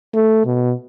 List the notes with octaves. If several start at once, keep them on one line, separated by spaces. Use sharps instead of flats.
A3
B2